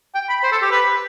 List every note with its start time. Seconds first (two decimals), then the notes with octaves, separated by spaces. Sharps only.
0.15 G5
0.29 B5
0.43 C5
0.52 A4
0.62 G4
0.71 B4